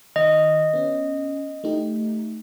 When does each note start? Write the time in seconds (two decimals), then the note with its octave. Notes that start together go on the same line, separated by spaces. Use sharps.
0.16 D#3 D#5
0.73 B3 C#4
1.64 A3 D#4 G4